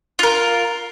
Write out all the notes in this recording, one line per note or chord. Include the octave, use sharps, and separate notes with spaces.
F4 A#4